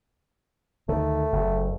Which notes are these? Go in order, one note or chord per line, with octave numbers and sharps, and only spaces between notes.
D2 D#3 A3
F#1